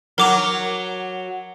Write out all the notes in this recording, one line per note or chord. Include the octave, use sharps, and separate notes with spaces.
F#3 F#4 A#4 D6 F7